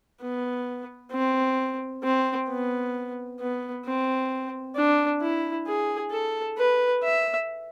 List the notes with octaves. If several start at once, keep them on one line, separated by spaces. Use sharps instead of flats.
B3
C4
C4
B3
B3
C4
D4
E4
G#4
A4
B4
E5